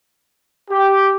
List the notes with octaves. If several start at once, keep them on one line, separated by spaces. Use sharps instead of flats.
G4